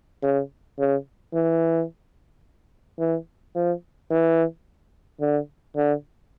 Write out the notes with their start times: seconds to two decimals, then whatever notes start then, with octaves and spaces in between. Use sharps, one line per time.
0.23 C#3
0.79 C#3
1.34 E3
2.99 E3
3.55 F3
4.10 E3
5.21 D3
5.76 D3